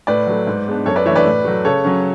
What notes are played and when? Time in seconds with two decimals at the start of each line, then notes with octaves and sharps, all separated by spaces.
0.07 A2 B4 D5
0.27 F#3 A3
0.47 G#2
0.67 G#3 B3 D4
0.86 F#2 A4 C#5
0.96 B4 D5
1.06 E3 A3 D4 C#5 E5
1.15 B4 D5
1.26 A2
1.45 F#3 A3
1.65 C#3 A4 C#5
1.85 F#3 C#4